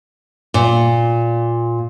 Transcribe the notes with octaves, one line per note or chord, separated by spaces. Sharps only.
A#2